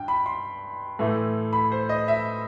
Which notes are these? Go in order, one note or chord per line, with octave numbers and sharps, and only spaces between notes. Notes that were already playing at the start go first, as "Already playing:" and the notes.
Already playing: G2 G5
B5
C6
A2 E3 A3
B5
C5
D#5
E5